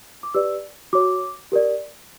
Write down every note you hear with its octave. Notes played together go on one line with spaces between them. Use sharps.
D6
G4 B4 D5 E6
F#4 C#5 D6
G4 A#4 D5